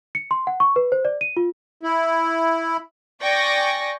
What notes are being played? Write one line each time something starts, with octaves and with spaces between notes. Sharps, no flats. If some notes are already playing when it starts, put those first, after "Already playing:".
C#7
C6
F#5
C#6
B4
C5
D5
D#7
F4
E4
D5 G5 G#5 C#6 A#6